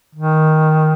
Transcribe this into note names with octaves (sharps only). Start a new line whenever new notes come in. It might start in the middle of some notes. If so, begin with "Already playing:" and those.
D#3